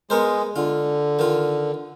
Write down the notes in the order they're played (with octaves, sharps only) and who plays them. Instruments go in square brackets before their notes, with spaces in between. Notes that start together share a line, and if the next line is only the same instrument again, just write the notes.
[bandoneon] G#3 [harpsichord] B3 A#4 C5
[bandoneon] D3 [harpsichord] F4
[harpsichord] D#3 F4